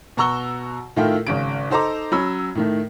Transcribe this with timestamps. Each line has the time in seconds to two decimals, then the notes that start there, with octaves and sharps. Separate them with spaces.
0.17 B2 F#4 A#5 C#6 E6 G7
0.96 A2 D#3 E4 F4 A4 G5
1.27 G#1 C#3 D7
1.71 D#4 A4 C5 D#5 A#5 D6
2.12 F#3 C#4 B5 E6
2.55 A2 D#3 A3